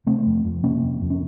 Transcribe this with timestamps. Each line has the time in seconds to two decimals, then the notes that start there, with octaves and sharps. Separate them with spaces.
0.07 C3 A3 C4
0.26 F2
0.45 F2
0.63 C3 A#3 C#4
0.83 F2
1.01 F2
1.10 C#4